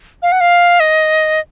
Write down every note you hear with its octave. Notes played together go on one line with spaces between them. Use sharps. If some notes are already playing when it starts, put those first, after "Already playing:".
F5
F#5
F5
D#5